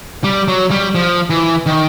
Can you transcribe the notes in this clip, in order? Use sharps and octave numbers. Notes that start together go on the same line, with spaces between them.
G3
F#3
G3
F3
E3
D#3